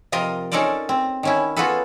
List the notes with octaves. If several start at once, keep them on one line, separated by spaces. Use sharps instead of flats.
C3 F3 F4 A#4 D#5
C#4 D#4 A4 A#4 C5 D5
C4
D#3 C#4 E4
B3 F4 F#4 G#4 A4 B4